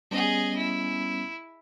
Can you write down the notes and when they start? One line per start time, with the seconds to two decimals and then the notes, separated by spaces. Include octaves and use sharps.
0.11 G3 B3 C#4 G#4 D#5
0.56 E4